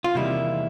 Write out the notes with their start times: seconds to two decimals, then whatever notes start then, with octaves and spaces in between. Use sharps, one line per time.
0.04 F4
0.14 E2 C3 D#3 G3 A#3 E4